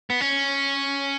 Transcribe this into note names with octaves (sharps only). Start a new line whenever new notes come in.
B3
C#4